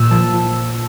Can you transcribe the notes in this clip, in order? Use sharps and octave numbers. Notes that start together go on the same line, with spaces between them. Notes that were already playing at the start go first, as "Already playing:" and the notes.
Already playing: A#2 E6
F3 A5
F3